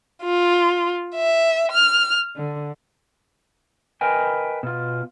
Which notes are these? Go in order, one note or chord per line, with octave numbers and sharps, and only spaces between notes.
F4
E5
F6
D3
A#4 B4 D#5 G5 G#5
B2 F4